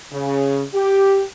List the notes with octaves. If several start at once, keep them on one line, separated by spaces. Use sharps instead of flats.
C#3
G4